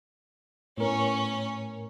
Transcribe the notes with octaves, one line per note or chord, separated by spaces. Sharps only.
A2 B3 C#4 A#4 C#5